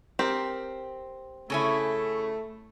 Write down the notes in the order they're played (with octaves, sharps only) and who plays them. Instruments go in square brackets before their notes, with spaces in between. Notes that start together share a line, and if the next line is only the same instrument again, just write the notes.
[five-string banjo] C4 G4 A#4
[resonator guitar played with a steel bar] C#3 C#4 E4 [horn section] A3